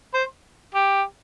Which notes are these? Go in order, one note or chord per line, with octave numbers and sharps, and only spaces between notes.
C5
G4